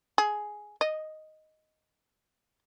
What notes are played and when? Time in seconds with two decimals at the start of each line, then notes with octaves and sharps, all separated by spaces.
0.18 G#4
0.81 D#5